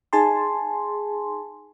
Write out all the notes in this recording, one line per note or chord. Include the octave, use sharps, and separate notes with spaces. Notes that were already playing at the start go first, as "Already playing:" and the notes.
D#4 G#4 G#5 A5 C6